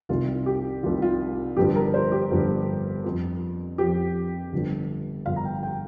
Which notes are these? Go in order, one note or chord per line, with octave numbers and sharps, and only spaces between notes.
C2 C3 D#3 F4
G4
C2 C3 D#3 F4
F4
G1 G2 F3 G4
A#4
C5
G4
G1 G2 F3
F2 F3
F2 F3 G4
G1 G2 F3
G1 G2 F3 F5
A#5
G5
G5